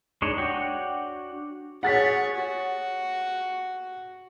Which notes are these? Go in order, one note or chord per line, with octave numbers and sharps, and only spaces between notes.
G#3 D4 D#4 C#5
D4 F#4 C#5 G5
G#4 C#5 F#5 A6 B6
F#4